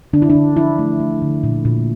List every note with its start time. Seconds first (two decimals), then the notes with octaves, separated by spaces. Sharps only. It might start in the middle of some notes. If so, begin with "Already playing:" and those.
0.13 D3 D4
0.22 E4
0.30 D4
0.35 D3
0.57 F3 E4
0.79 A3
1.00 A3
1.22 D3
1.43 A#2
1.65 A#2